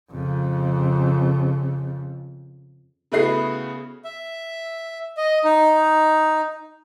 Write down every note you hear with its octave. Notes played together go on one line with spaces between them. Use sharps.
F2 C#3
C#3 A3 B3 E4 F#4 C7
E5
D#5
D#4